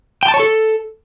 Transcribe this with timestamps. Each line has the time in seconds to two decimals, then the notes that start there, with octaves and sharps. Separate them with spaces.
0.23 G5
0.28 A5
0.34 C#5
0.39 A4